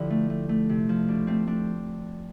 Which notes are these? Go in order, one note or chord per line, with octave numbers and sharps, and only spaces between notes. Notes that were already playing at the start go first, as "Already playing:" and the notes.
Already playing: D3 F3 E4 G4 D5
A3
A3
A3
C3
F3
B2 D4
A3 C4
A3 D4